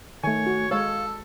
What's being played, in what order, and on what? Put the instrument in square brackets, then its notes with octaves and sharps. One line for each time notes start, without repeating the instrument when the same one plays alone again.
[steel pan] D#3 [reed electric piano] A3 G#5 [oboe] C#5
[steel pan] F#4
[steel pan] G#3 C#5 [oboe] A4 [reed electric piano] F5 A5